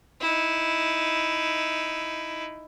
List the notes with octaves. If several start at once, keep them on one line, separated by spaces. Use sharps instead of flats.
D#4 E4